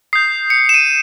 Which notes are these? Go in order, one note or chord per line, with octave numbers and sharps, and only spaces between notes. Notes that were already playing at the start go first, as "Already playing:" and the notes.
D#6 G6 C7
C#7
E7
D#7